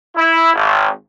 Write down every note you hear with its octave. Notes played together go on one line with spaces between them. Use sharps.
E4
G#1